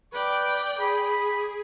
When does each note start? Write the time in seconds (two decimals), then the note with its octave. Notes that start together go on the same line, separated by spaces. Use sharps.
0.13 B4 D5 G5
0.80 G#4 B5